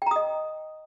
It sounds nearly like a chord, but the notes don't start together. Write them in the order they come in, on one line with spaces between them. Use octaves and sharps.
G5 A#5 D#6 D#5